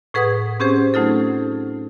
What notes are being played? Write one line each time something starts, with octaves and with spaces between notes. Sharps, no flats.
A2 G#4 B4 F#5 D#6 G#6
C4 C#4 G4 G#4 C5
F#3 A3 D#4 F4 A4